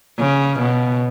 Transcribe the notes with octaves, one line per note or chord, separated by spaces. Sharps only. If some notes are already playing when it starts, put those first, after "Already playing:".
C#3
B2